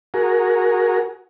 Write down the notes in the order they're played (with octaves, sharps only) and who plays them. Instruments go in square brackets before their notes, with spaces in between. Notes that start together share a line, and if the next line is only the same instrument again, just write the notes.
[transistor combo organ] F#4 G#4 A#4